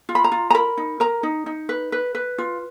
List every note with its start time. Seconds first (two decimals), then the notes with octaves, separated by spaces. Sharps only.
0.09 F4
0.15 B5
0.24 A#5
0.32 F4
0.50 A#5
0.54 A#4 B5
0.77 D#4
1.00 A#4 A#5
1.23 D#4
1.46 D#4
1.69 B4
1.92 B4
2.15 B4
2.38 F4